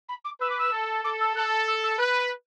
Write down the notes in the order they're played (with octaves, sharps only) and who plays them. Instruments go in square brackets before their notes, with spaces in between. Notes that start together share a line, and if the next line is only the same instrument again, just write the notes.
[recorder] B5
D6
[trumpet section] B4 [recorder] E6
[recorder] D6
E6
[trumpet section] A4
[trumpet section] A4 [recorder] D6
[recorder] E6
[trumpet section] A4 [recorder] F#6
[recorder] E6
E6
[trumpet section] B4 [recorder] F#6